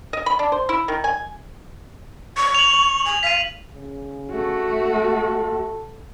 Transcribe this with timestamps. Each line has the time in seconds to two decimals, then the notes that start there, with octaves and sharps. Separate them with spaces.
0.13 D#5
0.26 B5
0.39 D4
0.52 C5
0.69 E4
0.88 D#3
1.04 G#5
2.37 C#6
2.55 F7 F#7
3.05 G#5
3.23 F5 B6 D#7
3.73 C#3
4.32 A3 F#4
4.89 A4